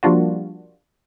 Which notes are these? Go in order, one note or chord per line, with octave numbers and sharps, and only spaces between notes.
F3 G3 A#3 D4 F4 F#4